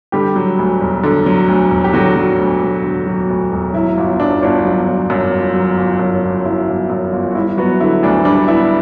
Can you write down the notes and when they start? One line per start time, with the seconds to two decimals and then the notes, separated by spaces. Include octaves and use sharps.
0.12 D3 G3 G4
0.36 F#3
0.59 D2
0.81 E1
1.03 D3
1.26 F#3
1.48 D2
1.70 E1
1.84 G4
1.93 D3 F#3 F#4
2.16 F#3
2.38 D2
2.61 E1
2.84 D3
3.07 F#3
3.30 D2
3.52 E1
3.74 F#3 E4
3.97 G1
4.20 F#2 D4
4.42 G1 D4
4.65 F#3
4.86 G1
5.10 F#2
5.33 G1
5.54 F#3
5.78 G1
5.99 F#2
6.23 G1
6.45 F#3 E4
6.68 G1
6.90 F#2
7.13 G1
7.31 F#4
7.35 G3 E4
7.57 F#3 B3 F#4
7.80 D3 E4
8.03 D2 D4
8.25 G3 D4
8.48 B3 E4